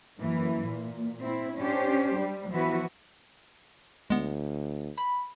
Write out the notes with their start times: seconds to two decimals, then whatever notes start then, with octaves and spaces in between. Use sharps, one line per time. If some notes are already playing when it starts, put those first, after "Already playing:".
0.18 F#2 E3 A#3
0.66 A#2
1.21 C4 E4
1.56 C#4 D4 G4 C5
2.16 G3
2.51 E3 F3 B3 E4 F#4 B4
4.10 D2 G#3 B3
4.98 B5